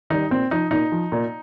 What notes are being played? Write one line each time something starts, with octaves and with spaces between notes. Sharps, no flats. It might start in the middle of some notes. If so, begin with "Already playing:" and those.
D#3 G3 D#4
A#2 C4
F3 D#4
A#2 D#4
F3
A#2